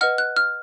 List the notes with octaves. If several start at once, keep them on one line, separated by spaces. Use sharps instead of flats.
B4 D#5 F#5 F6
F#6
F6